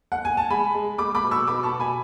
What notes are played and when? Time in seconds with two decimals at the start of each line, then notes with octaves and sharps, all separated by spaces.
0.12 F#5
0.25 G#5
0.37 A5
0.50 G#3 G#5 B5
0.74 G#3
0.98 G#3 B5 D6
1.15 B5 D6
1.23 B2
1.31 C#6 E6
1.47 B2 B5 D6
1.63 A5 C#6
1.72 B2
1.80 G#5 B5